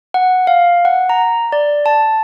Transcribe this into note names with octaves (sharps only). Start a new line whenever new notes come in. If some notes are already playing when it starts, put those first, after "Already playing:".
F#5
F5
F#5
A#5
D5
A5